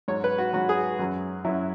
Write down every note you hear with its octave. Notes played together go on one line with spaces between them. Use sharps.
G#2 F#3 C#5
B4
F#4
G#2 F#3 F#4
G#4
F#2 F#3
F#2 F#3 E4